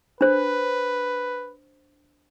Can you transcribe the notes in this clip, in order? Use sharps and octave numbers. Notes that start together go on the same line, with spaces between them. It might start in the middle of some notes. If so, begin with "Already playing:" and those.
D4 B4 C5